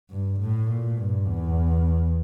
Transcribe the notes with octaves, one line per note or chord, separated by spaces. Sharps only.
G2
A2
A#2
G2
E2